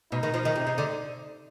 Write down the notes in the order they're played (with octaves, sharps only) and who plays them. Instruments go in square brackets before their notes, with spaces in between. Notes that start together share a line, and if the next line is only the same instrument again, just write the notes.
[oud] B2 [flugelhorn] D#4
[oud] D#3
F3
D#3
C3
C3
D3